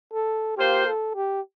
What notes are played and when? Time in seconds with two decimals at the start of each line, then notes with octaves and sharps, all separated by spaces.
0.13 A4
0.57 A#3 F4 G4 C5
0.86 A4
1.15 G4